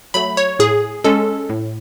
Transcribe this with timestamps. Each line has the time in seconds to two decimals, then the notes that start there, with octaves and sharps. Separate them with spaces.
0.14 F#3 A3 B5
0.37 C#5
0.59 A2 G#4
1.04 G#3 C#4 A4
1.49 A2